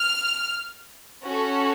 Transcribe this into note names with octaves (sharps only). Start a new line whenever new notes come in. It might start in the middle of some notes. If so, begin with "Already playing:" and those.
Already playing: F6
C#4 F#4 A4